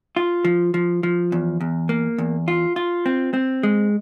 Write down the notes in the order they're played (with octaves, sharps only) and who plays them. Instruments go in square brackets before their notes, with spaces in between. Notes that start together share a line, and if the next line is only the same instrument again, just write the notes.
[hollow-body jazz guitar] F4
F3
F3
F3
E2
E2
A#3
E2
F4
F4
C4
C4
G#3